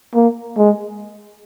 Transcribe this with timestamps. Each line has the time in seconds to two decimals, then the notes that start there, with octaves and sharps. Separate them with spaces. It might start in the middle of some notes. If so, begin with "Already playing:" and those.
0.15 A#3
0.57 G#3